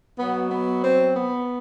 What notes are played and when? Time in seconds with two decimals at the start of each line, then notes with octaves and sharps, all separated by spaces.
0.19 B2 F#3 B3
0.51 B3
0.84 C4
1.16 B3